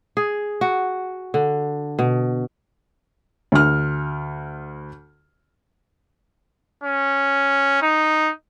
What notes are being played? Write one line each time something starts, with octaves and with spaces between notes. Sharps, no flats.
G#4
F#4
D3
B2
D2 F6
C#4
D#4